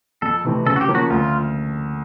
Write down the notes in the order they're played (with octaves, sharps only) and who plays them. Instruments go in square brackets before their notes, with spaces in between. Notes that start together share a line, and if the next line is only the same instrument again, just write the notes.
[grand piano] F2 [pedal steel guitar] A4
[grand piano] C3 E3 A3 C4
[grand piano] C#3 [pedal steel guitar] A4
[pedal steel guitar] F#4
G4
[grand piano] F3 A#3 C#4
[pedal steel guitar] F#4
[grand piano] D2 [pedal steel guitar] F4